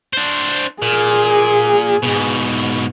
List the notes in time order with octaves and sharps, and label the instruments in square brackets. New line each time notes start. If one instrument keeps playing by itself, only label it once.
[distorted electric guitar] D4 C5
[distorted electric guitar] A#2 [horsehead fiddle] G#4
[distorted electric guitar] G#2 B2